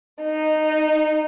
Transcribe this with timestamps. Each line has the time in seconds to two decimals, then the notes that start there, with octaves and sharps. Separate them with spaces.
0.23 D#4